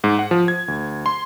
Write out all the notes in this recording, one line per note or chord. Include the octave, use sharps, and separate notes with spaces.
G#2
F#5
F3
G#6
D2
C6